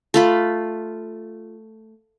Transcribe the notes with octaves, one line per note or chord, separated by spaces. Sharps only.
A3 F4 B5